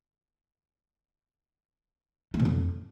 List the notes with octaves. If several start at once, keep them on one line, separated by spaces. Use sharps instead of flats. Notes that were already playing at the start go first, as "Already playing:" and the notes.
A3
B2
F2